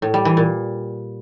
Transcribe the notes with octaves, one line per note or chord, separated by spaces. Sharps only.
A2
G3
E3
A#2